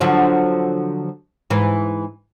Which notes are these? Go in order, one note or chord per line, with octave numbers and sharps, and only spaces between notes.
D3 F3 F#3
G#2 E3